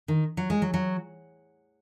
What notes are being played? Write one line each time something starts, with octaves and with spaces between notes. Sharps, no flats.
D#3
F#3
G#3
F#3
F#3